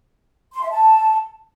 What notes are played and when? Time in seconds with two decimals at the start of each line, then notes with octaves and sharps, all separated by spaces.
0.54 C6
0.62 E5
0.71 A5